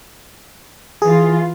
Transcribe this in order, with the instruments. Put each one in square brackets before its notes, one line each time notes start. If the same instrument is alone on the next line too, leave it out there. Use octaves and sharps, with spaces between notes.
[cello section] E3 F4 [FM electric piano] G#4